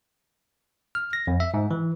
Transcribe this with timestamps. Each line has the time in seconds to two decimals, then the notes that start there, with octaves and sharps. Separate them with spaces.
0.95 F6
1.13 A#6
1.27 F2
1.40 E5
1.54 G#2
1.71 E3